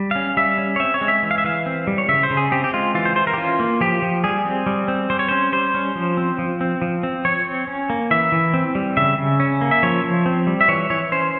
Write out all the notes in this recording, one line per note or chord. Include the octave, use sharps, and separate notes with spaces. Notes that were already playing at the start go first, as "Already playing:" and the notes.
Already playing: G3
C#4 F5
G3 E5
C#4
C#5
C4 E5
C#5
G#3
E5
E3
F5
E5
E3 F5
C4
G3
C#5
C#3 E5
C5
C#3
G#4
C4 G4
G4
G#3 F4
E3 F4
C5
E3 C5
A#4
G4
C#4 F4
A#3
F3 G4
F3
G3 G#4
C4
G3
C4
G3 C5
C#5
C#4 C5
G3 C5
C#4
F3
C4
F3
C4
F3
C4
F3 C#5
C4
C#4
A#3
E3 E5
E3
C4
G3
C#3 E5
C#3
C#4
A#3
E5
F3 C#5
F3
C4
G3
E5
E3 C#5
E3 C#5
C#4 C5